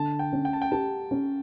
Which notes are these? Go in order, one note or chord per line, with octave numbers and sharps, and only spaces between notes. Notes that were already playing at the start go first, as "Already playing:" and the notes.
Already playing: D3 A5
G5
C#4
G5
A5
G5
G4 A5
C#4